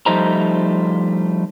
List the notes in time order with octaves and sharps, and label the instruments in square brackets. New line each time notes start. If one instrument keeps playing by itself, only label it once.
[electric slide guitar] F3 G3 A3 D#4 C5 A#5